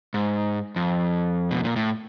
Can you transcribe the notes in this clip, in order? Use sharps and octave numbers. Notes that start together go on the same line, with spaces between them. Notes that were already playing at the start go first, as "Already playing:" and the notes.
G#2
F2
B2
A#2
A2